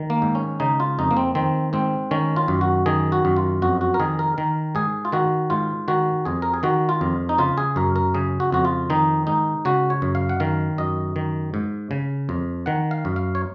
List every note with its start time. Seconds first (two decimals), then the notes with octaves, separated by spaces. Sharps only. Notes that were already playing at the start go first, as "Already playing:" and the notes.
Already playing: D#3
0.10 A#3
0.22 G#2
0.35 C#4
0.60 C#3 D#4
0.80 F4
0.99 F2 D#4
1.11 A#3
1.17 C4
1.35 D#3 C4
1.73 G#2 C4
2.11 D#3 C#4
2.36 F4
2.48 F#2
2.61 F#4
2.86 D#3 G#4
3.12 F#4
3.25 F#2
3.36 F4
3.62 F2 F#4
3.81 F#4
3.94 A#4
4.00 D#3 G#4
4.19 A#4
4.38 D#3 A#4
4.75 G#2 G#4
5.05 F4
5.12 D#3 F#4
5.50 G#2 F4
5.88 D#3 F#4
6.25 F2 G#4
6.42 A#4
6.54 G#4
6.63 D#3 F#4
6.89 F4
7.01 F2
7.29 D#4
7.38 C#3 F4
7.58 G#4
7.76 F#2 A#4
7.96 A#4
8.14 C#3 G#4
8.40 F#4
8.52 F2 F#4
8.65 F4
8.90 D#3 D#4
9.27 G#2 D#4
9.65 C#3 F#4
9.90 C#5
10.02 F#2
10.15 F5
10.29 F#5
10.40 D#3 F5
10.78 F#2 D#5
11.16 D#3
11.54 G#2
11.91 C#3
12.29 F2
12.66 D#3 F#5
12.91 F5
13.05 F#2
13.16 F5
13.35 C#5